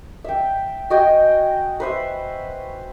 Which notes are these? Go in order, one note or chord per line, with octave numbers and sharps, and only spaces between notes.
E5 G5
F#4 D#5 G5 G#5
B4 C5 E5